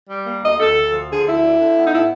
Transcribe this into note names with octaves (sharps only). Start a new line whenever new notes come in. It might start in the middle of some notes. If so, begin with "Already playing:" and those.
G3
A#3
D2 D#5
D2 A4
D2
F3
D3 G#4
D2 E4
D3
D3
B3
D#4
A2 E4